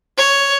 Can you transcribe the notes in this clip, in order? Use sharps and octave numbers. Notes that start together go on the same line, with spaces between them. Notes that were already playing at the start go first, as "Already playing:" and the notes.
C#5